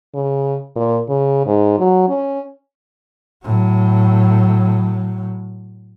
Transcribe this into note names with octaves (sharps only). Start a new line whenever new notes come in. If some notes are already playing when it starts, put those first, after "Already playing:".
C#3
A#2
C#3
G#2
F#3
C#4
A2 F#3